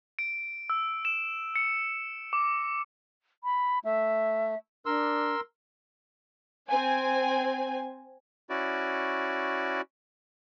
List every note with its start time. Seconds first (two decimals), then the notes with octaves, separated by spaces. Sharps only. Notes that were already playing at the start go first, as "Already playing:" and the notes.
0.19 D7
0.70 E6
1.05 E7
1.56 C#7
2.33 D6
3.44 B5
3.85 A3 E5
4.86 D4 A#4 C6 E6
6.70 C4 G#5
8.50 C#4 E4 F#4 D5